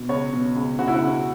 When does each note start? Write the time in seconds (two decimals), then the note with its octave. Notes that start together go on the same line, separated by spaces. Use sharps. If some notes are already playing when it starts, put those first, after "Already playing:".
Already playing: B2
0.09 C#2 C#5
0.33 B2
0.56 C#2
0.79 C#2 F#4
0.88 E4
0.95 F#4
1.02 C#2